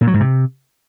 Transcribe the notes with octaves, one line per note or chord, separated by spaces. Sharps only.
A#2
F#3
G#2
C3